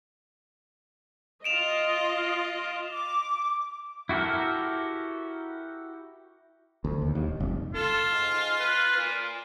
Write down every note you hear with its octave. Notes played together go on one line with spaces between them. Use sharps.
F4 D#5 D7 E7 F7
D6
E4 F#4 G4 A4 A#4
D2
D#2
D#2
D1
F1
F4 A4
G#2
B4
A#2